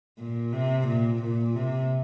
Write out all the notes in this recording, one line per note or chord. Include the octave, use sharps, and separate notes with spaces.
A#2
C3
A#2
A#2
C3